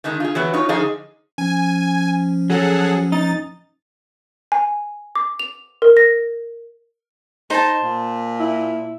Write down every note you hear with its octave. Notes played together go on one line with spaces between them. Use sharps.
D3 D#3 G#3 D#4
F4 G#4
E3 F#3 B3
D#4 F4 C#5
D3 F3 D#4 G#4 F5
F3 C#4 G#5
F#3 G#4 A4 F#5
D#4 A6
G#5
D6
F7
A#4
A#6
D#4 C5 A5
A#2
E4